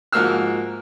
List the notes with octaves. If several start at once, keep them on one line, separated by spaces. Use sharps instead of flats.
G#2 F3 A#3 F#4 E6 F6